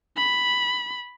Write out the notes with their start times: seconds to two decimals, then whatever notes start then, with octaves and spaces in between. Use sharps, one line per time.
0.17 B5